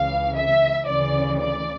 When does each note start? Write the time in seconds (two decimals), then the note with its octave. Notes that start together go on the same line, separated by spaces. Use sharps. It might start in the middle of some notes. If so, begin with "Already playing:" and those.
Already playing: C#2 C#3 E3 F5
0.36 E5
0.88 D2 C#3 E3 D5
1.40 D5